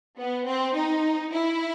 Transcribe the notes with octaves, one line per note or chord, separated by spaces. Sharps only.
B3
C4
D#4
E4